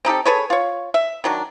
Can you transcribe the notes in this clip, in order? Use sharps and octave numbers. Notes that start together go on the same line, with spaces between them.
C4 D#4 G4 A4
G#4 A4 B4 C#5
F4 C#5
E5
D#3 F#3 D4